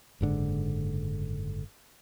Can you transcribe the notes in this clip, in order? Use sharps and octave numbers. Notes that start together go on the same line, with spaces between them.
F#1 G#2 D3